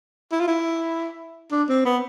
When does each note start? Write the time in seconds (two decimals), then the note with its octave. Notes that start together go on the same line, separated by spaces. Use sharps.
0.32 E4
0.40 F4
0.48 E4
1.51 D4
1.69 C4
1.85 B3